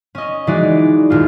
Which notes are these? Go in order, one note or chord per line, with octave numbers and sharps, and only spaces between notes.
C#4 D#5
E3 G#3 D#4 F#4 D5
D#1 F4